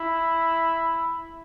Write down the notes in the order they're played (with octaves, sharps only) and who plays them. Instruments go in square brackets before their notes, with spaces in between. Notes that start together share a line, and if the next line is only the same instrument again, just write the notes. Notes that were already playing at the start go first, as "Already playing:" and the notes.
Already playing: [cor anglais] E4